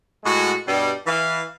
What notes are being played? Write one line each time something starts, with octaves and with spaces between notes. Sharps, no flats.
A2 G#3 F#4
G2 B2 G3
E3 F5